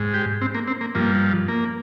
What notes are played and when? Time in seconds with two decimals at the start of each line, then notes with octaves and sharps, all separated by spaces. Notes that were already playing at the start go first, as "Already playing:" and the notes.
Already playing: G#2
0.14 G4
0.41 C4
0.55 A#3
0.67 C4
0.81 A#3
0.95 G2 F3 A#3
1.48 A#3